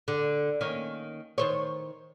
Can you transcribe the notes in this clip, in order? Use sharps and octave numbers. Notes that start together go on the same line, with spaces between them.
D3
D#3 A#3 C#4
D#3 C5 C#5